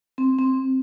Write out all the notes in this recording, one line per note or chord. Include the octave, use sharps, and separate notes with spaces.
C4
C4